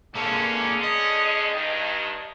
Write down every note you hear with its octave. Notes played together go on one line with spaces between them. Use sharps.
D3 G#3 A#3 C#4 A4
D#5
G2 D#3